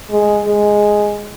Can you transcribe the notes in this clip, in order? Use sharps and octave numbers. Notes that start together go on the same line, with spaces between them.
G#3
G#3